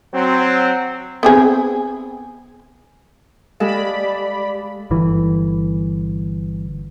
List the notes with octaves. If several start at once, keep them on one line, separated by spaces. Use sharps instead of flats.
F#3 C4
B3 C4 G#4
G#3 G4 A4 D5 F5 B5
G1 E3